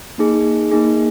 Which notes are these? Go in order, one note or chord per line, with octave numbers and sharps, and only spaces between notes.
A#3 D#4 G#4
A#3 D#4 G#4